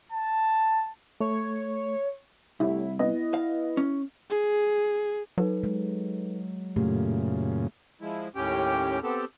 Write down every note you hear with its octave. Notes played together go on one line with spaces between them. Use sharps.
A5
A3 C#5
C2 A3 E4 G4 C#5
B3 E4 D#5
F5
C#4
G#4
F#3 D#4 A4 B4
G#3
F#2 A#2 C#3 A3 G4
F3 G#3 E4
D#2 A2 C#4 G4 G5
B3 C4 G4 A4